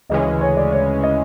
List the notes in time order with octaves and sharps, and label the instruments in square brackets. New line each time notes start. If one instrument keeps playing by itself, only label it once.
[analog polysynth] D2 C#3 E3 G#3 C#4 [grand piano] D#5
[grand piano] C#5
D5
C#5
D#5